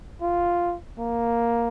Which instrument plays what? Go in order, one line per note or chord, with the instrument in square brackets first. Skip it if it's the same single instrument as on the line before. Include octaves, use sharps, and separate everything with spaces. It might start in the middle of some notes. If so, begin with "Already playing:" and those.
[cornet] F4
A#3